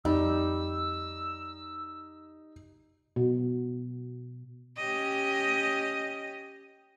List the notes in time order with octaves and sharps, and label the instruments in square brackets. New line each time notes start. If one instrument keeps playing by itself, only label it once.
[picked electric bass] F2 [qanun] G3 [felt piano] D#4 [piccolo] E6
[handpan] B2
[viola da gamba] C#4 G4 D#5